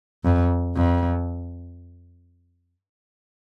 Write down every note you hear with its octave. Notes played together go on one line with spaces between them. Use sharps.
F2
F2